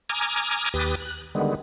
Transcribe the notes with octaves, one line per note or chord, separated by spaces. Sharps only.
G#5 A#5 D6 D#6 F6 G#6
D#2 G4 B4 D#6 A6
F#6
D3 D#3 G3 G#3 B3